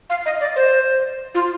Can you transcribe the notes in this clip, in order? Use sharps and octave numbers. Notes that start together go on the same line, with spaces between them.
F5
D#5
D5
C5
F4